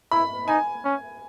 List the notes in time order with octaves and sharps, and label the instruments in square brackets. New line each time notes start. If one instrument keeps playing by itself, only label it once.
[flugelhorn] E4 [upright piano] B5
[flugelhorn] D#4 [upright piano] G#5
[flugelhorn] C#4